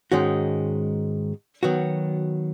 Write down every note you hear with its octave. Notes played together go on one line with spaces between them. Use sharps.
G#2 D#3 G#3 C#4 F#4
D#3 F#3 B3 F#4